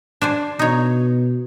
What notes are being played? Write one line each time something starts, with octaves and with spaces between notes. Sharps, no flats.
D4 C5 G#5
B2 D#4 C#5